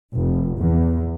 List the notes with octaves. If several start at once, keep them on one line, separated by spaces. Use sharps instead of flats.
F1
E2